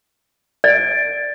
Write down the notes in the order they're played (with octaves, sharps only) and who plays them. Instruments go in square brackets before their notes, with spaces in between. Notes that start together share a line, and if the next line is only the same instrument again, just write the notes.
[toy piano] D5 [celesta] A6 D7